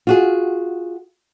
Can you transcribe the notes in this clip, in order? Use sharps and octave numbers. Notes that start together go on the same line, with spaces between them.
F4 F#4 G#4